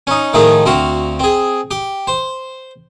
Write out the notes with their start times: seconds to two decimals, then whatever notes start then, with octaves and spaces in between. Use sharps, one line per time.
0.07 C#4 D#4
0.33 A2 D#3 F3 D#4 G#4
0.65 D2 C4 F#4 F5
1.19 C4 G#4
1.71 G4
2.07 C5